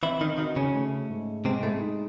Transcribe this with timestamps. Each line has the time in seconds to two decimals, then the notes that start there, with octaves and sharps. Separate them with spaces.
0.03 E3 C4 E4
0.21 D#3 D#4
0.38 D#3 D#4 F#4
0.56 C#3 C#4
0.74 A3
1.10 G#2
1.45 C3 G#3 C4
1.63 A2 A3
1.81 D#4